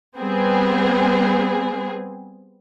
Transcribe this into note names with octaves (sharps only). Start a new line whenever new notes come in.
G3 B3 C4 G#4